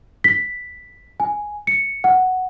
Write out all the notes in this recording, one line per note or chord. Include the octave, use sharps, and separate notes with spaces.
B6
G#5
C#7
F#5